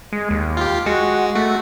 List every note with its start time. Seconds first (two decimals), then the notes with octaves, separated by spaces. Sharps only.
0.13 G#3
0.30 D#2
0.57 F4 G4
0.86 G#3 F#4
1.35 A3 F#4